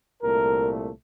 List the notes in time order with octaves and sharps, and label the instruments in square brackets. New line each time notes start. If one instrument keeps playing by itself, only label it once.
[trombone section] C2 A#2 A3 A#4